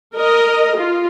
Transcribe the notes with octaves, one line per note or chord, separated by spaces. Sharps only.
A#4 D#5
F4